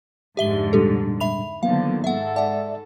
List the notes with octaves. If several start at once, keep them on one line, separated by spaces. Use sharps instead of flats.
F2 G#2 D3 G4 E5 G7
A#2 G3 D4 G4 A4
E5 B5 F7
D3 D#3 F3 F#3 A#3 B3 F5
G#2 A4 E5 F#5
D5 E5 F#5 A5